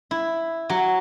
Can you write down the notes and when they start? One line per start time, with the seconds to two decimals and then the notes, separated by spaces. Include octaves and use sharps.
0.11 E4
0.70 F#3